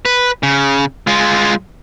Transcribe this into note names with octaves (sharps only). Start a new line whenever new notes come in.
B4
C#3
G#3 F4